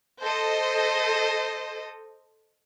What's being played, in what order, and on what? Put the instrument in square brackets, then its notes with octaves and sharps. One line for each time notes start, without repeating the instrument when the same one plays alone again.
[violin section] A4 C5 D#5